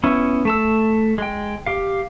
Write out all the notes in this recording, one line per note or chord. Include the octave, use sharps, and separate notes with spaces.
B3 C#4 E4
A3 A5 E6
G#3 G5
G4 F5